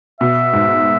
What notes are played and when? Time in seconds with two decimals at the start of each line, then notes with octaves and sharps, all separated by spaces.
0.20 B2 E5
0.53 G#2